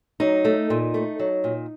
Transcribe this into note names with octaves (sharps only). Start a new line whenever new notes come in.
F#3 D#4
A3
A#2
A3
F#3
A#2